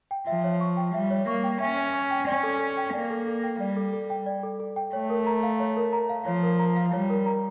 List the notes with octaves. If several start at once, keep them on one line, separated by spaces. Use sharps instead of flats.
G5
F3 E5
C#5
C#6
G5
G3 E5
C#5
A#3 C#6
G5
C#4 E5
C#5
C#6
G5
C#4 D5
A4
A4
G5
A#3 D5
A4
A4
G5
G3 D5
A4
A4
G5
D5
A4
A4
G5
A3 C#5
A#4
A#5
F5
C#5
A#4
A#5
F5
F3 C#5
A#4
A#5
F5
G3 C#5
A#4
A#5